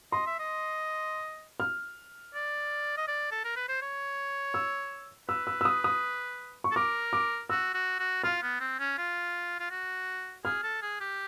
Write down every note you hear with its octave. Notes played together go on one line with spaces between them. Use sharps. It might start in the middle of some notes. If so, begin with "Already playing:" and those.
D#5 C6
E5
D#5
F6
D5
D#5
D5
A4
A#4
B4
C5
C#5
E6
B4 E6
E6
E6
D#6
D#6
C#6
A4
A#4 D6
D6
F#4 E6
F#4
F#4
F4 F6
B3
C4
C#4
F4
F4
F#4
G#4 F6
A4
G#4
G4